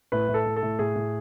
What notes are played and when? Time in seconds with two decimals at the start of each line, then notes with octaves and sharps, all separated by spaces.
0.12 A2 B4
0.28 A2
0.34 A4
0.46 A2
0.56 A4
0.62 A2
0.79 A2 G#4
0.96 A2